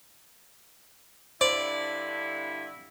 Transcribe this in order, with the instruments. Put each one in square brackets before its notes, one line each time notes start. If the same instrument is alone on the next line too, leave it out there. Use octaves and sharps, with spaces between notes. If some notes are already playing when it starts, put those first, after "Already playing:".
[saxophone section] G2 D3 E4 [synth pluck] C5 [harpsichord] D5